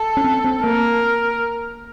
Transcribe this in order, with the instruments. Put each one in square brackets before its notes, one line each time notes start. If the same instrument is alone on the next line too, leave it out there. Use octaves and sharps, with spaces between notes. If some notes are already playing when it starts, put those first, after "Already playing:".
Already playing: [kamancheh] A4
[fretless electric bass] C#4
C4
C4
[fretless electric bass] A#3 [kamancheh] A#4